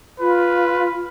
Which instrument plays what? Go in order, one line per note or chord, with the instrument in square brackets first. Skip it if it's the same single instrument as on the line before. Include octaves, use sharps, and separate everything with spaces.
[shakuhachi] F4 [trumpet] B4